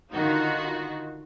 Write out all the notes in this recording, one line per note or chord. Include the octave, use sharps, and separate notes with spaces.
D3 D#3 D#4 F4 F#4